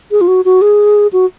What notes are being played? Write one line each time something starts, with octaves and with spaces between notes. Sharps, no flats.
G#4
F4
F#4
F#4
G#4
F#4